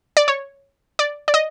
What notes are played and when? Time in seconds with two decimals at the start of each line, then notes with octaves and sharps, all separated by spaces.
0.17 D5
0.28 C#5
0.99 D5
1.28 D5
1.34 D#5